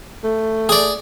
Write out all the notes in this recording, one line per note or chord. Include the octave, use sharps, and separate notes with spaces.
A3
G#4 D5